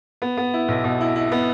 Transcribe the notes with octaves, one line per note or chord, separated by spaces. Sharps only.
B3
B3
E4
B1
B2
E4
E4
B3